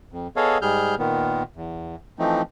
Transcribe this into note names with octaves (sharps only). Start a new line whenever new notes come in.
F2
B3 G#4 A4 C#5 D#5 F5
G#2 G3 G#4 F6 G6
A#2 D#3 B3
E2
E3 F3 A3 C4 D#4